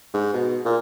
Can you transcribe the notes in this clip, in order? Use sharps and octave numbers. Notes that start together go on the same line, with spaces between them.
G#2
B2
A#2